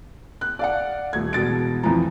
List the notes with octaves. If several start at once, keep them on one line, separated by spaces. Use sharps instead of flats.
F#6
D5 F5 F#5
D#1 A3 G#6
E1 B2 A6 D7
F2 E3 F3 A#5